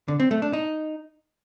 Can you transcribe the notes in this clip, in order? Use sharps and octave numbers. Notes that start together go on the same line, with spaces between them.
D3
C4
A3
D4
D#4